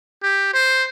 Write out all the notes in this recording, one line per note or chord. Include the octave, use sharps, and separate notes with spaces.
G4
C5